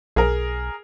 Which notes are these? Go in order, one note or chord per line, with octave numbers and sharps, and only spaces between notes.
B1 G#4 A#4